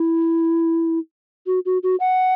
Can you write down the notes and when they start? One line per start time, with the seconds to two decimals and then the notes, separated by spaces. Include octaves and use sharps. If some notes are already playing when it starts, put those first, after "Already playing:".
Already playing: E4
1.47 F#4
1.66 F#4
1.83 F#4
2.00 F#5